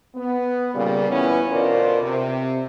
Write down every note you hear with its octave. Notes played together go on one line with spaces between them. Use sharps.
B3
A#2 C#3 G3
E3 B3 C#4
D2 B2 F4 A#4 C5 D5
C3